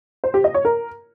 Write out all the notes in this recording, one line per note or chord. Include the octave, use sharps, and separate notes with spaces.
C5
G4
D#5
C#5
A#4